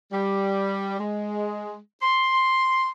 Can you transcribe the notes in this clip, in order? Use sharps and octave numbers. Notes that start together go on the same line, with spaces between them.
G3
G#3
C6